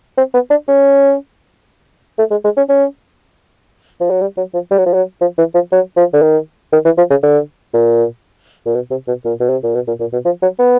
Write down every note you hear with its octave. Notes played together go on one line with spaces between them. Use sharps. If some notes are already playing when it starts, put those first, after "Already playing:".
C4
B3
D4
C#4
A3
G#3
G#3
C#4
C#4
F3
F#3
G3
F#3
F3
G3
F#3
F3
F#3
F3
E3
F3
F#3
F3
D3
D#3
D#3
E3
F3
C#3
D3
A#2
A#2
B2
C3
B2
A#2
B2
C3
A#2
B2
A#2
A#2
B2
F3
F#3
B3